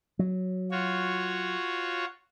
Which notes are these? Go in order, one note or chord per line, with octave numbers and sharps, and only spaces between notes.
F#3
F4 F#4 C#5